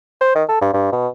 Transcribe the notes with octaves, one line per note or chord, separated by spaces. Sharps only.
C5
D#3
A4
G2
G2
B2